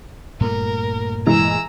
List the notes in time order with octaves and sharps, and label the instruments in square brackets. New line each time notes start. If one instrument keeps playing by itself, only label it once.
[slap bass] G2 A#2 A3 [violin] A#4
[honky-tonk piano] E3 G#3 [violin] A#5 E6